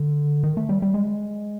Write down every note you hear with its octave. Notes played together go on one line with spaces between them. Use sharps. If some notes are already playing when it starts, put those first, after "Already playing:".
Already playing: D3
D#3
A3
G3
G3
G#3